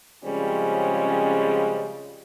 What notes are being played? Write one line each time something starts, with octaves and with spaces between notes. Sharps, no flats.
C#3 F3 G3 G#3 C4 C#4